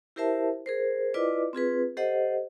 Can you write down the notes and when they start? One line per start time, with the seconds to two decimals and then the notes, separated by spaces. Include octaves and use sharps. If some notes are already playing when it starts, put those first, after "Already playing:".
0.16 E4 G4 A#4 C5 E5 A5
0.66 G#4 A#4 C5
1.14 E4 F4 B4 D5 D#5 D6
1.53 C4 F4 G#4 B4
1.97 G4 A4 C5 D#5 F#5